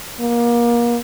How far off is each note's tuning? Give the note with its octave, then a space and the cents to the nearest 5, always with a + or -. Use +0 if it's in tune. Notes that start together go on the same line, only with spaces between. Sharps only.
A#3 +30